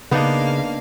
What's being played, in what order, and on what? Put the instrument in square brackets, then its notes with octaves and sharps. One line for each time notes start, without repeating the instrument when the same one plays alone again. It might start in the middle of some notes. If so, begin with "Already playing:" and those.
[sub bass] C#3 [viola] A#3 F5 [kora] B3 D4 D#4